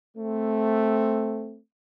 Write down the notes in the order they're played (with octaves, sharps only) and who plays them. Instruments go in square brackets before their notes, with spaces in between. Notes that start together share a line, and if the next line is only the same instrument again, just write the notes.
[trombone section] A3 C4